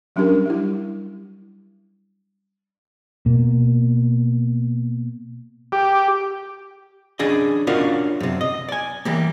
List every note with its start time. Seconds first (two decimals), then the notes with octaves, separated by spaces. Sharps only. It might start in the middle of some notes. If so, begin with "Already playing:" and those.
0.16 F#3 G3 C#4 D4 G4 A#4
0.46 G3 E4
3.26 B2 A#3
5.72 G4
7.19 C#4 D4 G#4 D#5
7.67 C#4 D4 F4 F#4 A#4 D#5
8.20 F#2 C3
8.41 D#5
8.69 D5 G#5
9.05 E3 G3 A#3